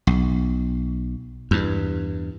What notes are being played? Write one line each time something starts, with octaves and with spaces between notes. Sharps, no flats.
B1
E2 G2